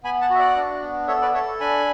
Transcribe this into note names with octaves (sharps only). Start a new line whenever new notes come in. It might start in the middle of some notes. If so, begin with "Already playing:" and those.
B3 G#5 B5
F#5 A5
F#4 E5
D5 F#5
D4
B3
A4 C#5 E5
B4 D5
A4 C#5 E5
D4 G#5 B5